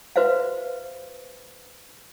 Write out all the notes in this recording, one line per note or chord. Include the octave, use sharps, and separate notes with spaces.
F#4 B4 C5 E5 F5